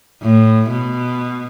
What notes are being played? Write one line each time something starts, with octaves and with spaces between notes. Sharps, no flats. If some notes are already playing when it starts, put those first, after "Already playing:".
A2
B2